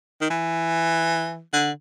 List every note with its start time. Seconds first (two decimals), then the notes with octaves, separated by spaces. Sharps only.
0.21 D#3
0.30 E3
1.53 D3